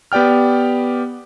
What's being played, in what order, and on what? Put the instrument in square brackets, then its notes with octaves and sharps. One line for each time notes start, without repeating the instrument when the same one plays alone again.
[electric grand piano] B3 G4 D5 G5 F6